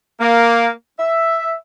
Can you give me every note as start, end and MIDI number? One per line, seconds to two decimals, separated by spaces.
0.20 0.69 58
0.98 1.53 76